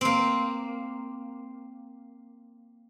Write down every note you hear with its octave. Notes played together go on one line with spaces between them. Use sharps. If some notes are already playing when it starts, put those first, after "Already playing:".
A#3 C4